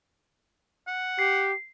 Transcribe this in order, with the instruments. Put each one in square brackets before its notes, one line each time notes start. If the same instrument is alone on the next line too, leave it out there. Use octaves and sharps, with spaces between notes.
[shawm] F#5
[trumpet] G4 [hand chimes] C7